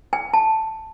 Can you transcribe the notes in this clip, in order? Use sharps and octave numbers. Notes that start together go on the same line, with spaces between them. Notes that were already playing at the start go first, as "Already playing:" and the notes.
G#5
A5